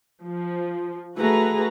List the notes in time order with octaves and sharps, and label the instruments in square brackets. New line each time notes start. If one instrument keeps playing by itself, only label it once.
[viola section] F3
[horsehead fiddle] A3 G#4 [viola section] F#4 B4 A#5